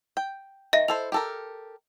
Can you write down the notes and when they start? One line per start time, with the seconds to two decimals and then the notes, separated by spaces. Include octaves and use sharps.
0.17 G5
0.73 D#3 D#5 E5 A#6
0.88 E4 A4 C5 F7
1.12 G4 A4 A#4